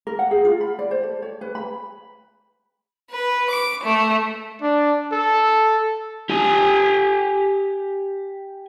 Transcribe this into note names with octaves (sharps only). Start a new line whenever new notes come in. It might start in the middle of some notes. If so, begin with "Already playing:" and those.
A#4
F#5
G#4
F4
B5
D5
C5
A4
C#5
B4
B5
B4
D6
A3
D4
A4
G4 G#5